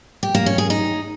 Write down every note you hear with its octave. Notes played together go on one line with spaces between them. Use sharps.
G4
A#3
C#4
G#4
D#4